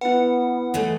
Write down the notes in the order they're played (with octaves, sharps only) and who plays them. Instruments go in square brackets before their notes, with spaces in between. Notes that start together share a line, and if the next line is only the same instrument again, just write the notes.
[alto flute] B3 [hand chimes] E4 B4 [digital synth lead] F#5
[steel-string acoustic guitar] E3 G#3 A3